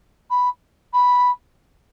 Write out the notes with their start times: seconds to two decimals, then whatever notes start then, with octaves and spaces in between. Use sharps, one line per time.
0.30 B5
0.93 B5